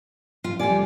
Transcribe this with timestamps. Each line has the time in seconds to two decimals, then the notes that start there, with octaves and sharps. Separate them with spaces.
0.44 F4
0.59 F1 G3 D5 G#5